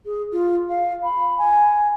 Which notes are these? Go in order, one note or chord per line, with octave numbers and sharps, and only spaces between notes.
G#4
F4
F5
B5
G#5